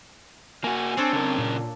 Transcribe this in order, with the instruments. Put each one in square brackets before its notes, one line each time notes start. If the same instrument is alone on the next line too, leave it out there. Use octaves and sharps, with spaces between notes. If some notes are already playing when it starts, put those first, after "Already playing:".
[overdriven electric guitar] A#3 F#4 [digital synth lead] G#5
[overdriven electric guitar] C4 [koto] D4 A4 C#5
[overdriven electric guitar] C#3 A#4 [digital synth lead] C4
[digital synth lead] A#2